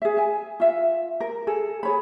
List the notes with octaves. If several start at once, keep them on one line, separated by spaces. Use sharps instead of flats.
G#4 E5
E5 G#5
F4 E5
A#4
G#4 A4
G#4 C#5 B5